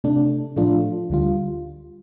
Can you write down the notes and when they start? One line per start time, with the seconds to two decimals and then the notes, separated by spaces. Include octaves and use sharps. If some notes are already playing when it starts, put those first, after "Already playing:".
0.04 C3 A3 D4
0.56 A2 F3 A3 D4 F4
1.10 D2 D3 G3 F4